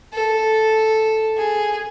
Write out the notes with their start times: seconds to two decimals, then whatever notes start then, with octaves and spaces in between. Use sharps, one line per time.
0.13 A4
1.37 G#4